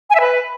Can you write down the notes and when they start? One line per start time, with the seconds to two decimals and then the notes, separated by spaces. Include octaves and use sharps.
0.10 G#5
0.15 E5
0.20 B4